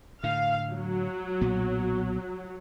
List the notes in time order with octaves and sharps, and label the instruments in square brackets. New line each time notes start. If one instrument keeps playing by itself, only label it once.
[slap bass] A2 D3 [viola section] F5
[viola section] F#3
[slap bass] B1 A#2 B3